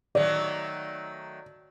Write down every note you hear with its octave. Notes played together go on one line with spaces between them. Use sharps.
D#3 F#3 A3 D5